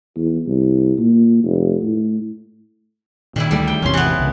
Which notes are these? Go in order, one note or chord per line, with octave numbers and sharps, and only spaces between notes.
E2
C2
A#2
F1
A2
A#2 D#3 G3 E4
D2 F#3 G3 A3
G5
A1 E2 C3 C#4 C6
E3 B3
C2 C#3